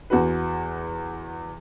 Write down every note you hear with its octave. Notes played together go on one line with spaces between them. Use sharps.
E2 F#4 B4